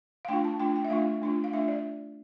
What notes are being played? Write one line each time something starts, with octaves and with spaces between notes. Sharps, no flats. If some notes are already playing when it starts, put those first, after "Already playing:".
F5
A3 D4 F4 G5
A5
A3 D4 F4 G5
G5
E5
A3 D4 F4 F5
A3 D4 F4
F5
A3 D4 F4 E5
D5